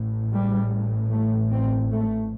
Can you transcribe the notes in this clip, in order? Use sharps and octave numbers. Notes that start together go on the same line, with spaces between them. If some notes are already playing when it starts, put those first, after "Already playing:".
Already playing: A1 A2
G3
A3
C4
A3